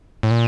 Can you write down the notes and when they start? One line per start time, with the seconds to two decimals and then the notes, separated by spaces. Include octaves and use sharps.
0.23 A2
0.31 A#2